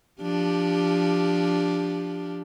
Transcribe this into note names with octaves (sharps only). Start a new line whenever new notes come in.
F3 D4 G4